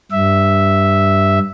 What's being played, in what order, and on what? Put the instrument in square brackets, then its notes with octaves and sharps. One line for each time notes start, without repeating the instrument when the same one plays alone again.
[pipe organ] G2 E5